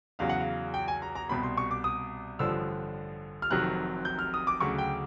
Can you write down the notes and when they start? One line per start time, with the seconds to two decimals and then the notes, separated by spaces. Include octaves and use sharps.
0.19 E2 C#3 F#3 F5
0.29 F#5
0.40 F5
0.74 G5
0.88 G#5
1.02 A#5
1.15 A#5
1.29 C2 B2 G3 B5
1.43 C6
1.57 C#6
1.71 D6
1.84 D#6
2.39 A1 G2 D3 F3 E6
3.42 F6
3.50 F1 F2 C3 D#3 F#3 F#6
4.05 G6
4.19 F6
4.34 D#6
4.47 D6
4.60 D2 C#3 F#3 C#6
4.78 G5